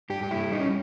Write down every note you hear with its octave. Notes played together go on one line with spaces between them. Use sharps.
G2 G4
G4
G2 E4
G3 D#4
C#4